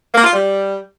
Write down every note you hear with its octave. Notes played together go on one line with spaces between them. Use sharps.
A#3
F4
G3